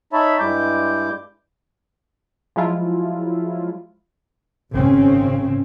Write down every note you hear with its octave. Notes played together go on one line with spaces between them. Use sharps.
D#4 C#5 E5 A5 B5
G2 G3 G#3 E4 D6 G6
F3 F#3 G#3 E4 F4
G#1 C#3 C4 C#4